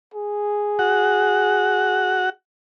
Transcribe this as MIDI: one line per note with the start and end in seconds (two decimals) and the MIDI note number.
0.14 2.32 68
0.79 2.30 66
0.79 2.30 78